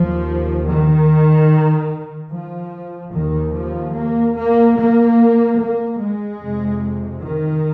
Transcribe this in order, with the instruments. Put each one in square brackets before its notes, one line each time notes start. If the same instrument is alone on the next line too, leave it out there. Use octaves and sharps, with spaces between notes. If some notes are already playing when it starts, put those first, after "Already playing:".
Already playing: [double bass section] D#2 F3
D#3
F3
D#2 D#3
F3
A#3
A#3
A#3
A#3
G#3
F2 C3
D#3